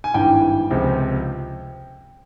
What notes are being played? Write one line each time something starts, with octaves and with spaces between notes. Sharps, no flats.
G#5
G#1 G2 E3 G5
C#2 C3 F3